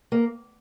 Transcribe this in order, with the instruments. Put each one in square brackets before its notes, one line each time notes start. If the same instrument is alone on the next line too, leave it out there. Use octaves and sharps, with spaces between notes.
[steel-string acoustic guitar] A#3